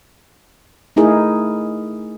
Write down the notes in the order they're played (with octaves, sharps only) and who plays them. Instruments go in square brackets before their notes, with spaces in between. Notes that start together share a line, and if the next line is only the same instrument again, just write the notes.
[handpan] A3 D#4 E4 G#4 A#4